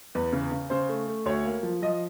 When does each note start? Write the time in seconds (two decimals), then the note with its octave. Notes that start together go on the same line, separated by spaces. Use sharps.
0.15 E2 B4
0.33 C#3
0.52 C#3
0.70 C#3 C5
0.89 A3
1.08 A3
1.26 D2 C#5
1.45 A#3
1.63 F3
1.82 F3 D#5